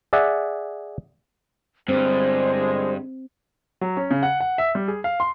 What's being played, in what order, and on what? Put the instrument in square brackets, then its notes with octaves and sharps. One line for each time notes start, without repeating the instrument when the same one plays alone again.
[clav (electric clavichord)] G#4 D5 E5 F#5
[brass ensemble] G1 D3 G#3 [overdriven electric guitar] G2 [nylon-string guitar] C4 [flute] C5
[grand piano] F#3
C#4
C#3
F#5
F#5
E5
G3
G#4
F5
C6